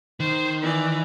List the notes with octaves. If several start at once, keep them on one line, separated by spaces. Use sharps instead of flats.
D#3 C5
E3 D5